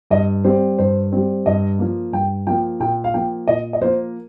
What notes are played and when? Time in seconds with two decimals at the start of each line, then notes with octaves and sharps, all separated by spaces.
0.11 G2 D#5
0.44 G3 C4 C5
0.79 G2 C5
1.12 G3 C4
1.46 G2 D#5
1.79 F3 A#3
2.13 G2 G5
2.47 F3 A#3 G5
2.80 A#2 G5
3.04 F5
3.14 F3 A#3 G5
3.48 A#2 D#5
3.73 D#5
3.81 F3 A#3 C5